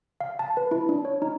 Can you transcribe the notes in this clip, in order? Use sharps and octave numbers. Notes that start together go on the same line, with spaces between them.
F5
A5
B4
E4
D4
C#5
D#4